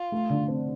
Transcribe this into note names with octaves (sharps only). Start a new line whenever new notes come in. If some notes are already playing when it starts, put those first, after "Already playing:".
Already playing: F4
A3
D3
C4